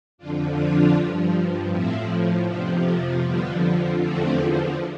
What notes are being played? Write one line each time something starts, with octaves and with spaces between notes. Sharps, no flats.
F2 D3 F3 D4 F4
D4 F4
G2 F3
A2 F3 C4 E4
F2 C3 F3 B3 D4
A3
F2 D3 F3 G3 B3
E2 D3 F3 A3 C4